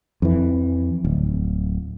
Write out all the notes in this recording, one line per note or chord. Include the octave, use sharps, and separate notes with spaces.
F2 E3
D1